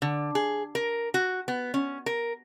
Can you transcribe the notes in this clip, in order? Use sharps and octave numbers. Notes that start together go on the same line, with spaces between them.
D3
G#4
A#4
F#4
B3
C#4
A#4